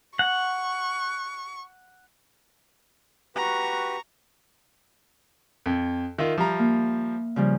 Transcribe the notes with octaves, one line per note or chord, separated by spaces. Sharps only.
F#5 C#6
F#4 G4 B4 A#5 C#6
F2
D#3 F4 E5
F3 G3 A#5
A#3
C#3 F3 G3